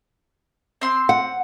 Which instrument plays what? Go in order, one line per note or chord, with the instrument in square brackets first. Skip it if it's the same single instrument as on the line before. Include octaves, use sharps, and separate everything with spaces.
[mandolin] C4 C6
[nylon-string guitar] F#5